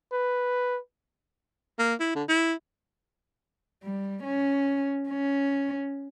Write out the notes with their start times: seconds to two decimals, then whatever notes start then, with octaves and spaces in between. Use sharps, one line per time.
0.12 B4
1.79 A#3
2.00 E4
2.16 D3
2.29 E4
3.83 G3
4.24 C#4
5.09 C#4